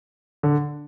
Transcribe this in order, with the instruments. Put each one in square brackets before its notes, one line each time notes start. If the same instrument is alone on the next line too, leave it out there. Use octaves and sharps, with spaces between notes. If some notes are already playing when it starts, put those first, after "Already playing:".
[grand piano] D3